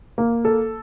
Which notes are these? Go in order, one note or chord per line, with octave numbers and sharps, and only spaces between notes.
A#3
A4